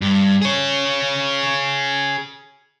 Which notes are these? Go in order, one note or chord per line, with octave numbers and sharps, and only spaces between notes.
G2
G#4 C#5